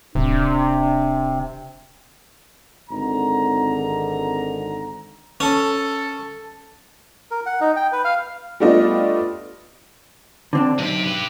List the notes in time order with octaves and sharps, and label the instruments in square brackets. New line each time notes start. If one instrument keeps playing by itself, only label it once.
[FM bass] D1 [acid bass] C3 [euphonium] D4
[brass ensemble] G#1 D3 A#5
[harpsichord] C#4 [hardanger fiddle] A4
[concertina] A#4
F#5
D#4
G5
B4
F5
[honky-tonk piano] G3 A3 B3 D4 F4 D#5
[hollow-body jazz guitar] D3 C4 D4
[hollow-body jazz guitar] B1 [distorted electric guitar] C3 G4
[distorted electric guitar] G4 B4